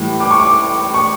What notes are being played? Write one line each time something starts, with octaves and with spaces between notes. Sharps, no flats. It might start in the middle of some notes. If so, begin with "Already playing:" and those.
Already playing: A2 E3 G3
D6
C#6
D6
C#6